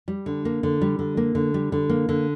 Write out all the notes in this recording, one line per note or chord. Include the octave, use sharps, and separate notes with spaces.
G3
D3
A#3
D3
G3
D3
A#3
D3
G3
D3
A#3
D3